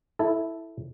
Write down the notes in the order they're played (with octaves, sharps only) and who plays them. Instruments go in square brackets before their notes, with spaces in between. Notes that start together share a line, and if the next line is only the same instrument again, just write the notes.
[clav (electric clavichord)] E4 A4